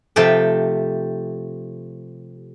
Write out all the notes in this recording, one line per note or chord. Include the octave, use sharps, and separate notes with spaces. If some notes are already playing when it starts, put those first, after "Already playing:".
C3 F3 A3 G4 A4 G5